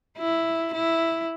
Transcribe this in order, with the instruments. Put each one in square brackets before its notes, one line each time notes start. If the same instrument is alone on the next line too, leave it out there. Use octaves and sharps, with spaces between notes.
[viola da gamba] E4
E4